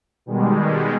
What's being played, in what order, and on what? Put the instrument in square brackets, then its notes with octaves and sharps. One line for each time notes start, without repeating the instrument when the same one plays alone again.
[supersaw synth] B2 D#3 G3 G#3